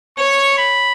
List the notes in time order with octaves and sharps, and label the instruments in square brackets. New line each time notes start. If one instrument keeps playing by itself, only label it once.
[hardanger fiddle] C#5 [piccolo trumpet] C#6
[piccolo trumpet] B5